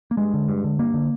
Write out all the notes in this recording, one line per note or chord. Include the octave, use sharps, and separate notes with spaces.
A#3
G2 G#3
D3
G2
D3
G2 A#3
D3